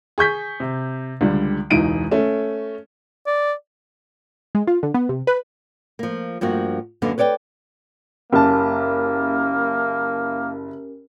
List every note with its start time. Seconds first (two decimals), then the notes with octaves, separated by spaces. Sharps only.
0.18 G#4 C#6 G6 B6
0.60 C3
1.21 C#2 D3 G3
1.70 E1 C#2 E3 D#4 D7 D#7
2.11 A3 C#4
3.27 D5
4.55 G#3
4.67 F4
4.83 D3
4.94 B3
5.09 C3
5.27 B4
5.99 F3 A#3
6.41 G2 F3 A#3 F#4
7.02 F#2 D3 A#3 B3 F5
7.18 B4 C#5 D5 F5 G5
8.33 F#1 A#3 C#4 G4 A#4 A5